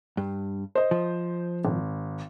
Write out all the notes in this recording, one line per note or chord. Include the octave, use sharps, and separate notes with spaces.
G2
C5 D#5
F3
G#1